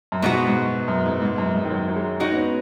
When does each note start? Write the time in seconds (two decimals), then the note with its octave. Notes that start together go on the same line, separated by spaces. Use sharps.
0.12 F#2
0.22 G#2 B2 B3 F#4
0.47 G#2
0.88 F#2
1.05 G#2
1.22 G#2
1.38 F#2
1.55 G#2
1.65 D#3
1.70 F#3
1.88 F#3
1.96 G#3
2.20 G#3 D#4 F#4
2.32 B3
2.37 C#4